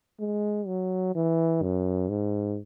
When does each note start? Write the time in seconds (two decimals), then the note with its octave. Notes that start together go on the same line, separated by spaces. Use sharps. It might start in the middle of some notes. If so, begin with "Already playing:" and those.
0.20 G#3
0.67 F#3
1.15 E3
1.62 F#2
2.09 G#2